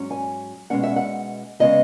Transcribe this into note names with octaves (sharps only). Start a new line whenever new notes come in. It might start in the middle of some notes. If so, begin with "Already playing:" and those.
Already playing: G#2 F#3 C#4
G#5
B2 G#3 C#4 F#5
E5
F#5
C#3 G#3 B3 D#5